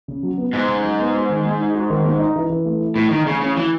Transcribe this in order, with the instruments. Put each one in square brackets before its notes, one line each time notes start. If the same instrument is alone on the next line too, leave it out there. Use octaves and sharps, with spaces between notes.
[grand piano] C#3
F#3
B3
[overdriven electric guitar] G#2 [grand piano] D#4
[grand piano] C#3
F#3
B3
F#4
D#3
G#3
D#4
F#4
D#3
G#3
D#4
E3
E3
A3
E4
[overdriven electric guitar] A2 [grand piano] E3
[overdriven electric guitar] D#3 [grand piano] E3
[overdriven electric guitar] C#3 [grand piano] A3
[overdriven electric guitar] C#3 [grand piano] E4
[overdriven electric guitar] E3 [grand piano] F#4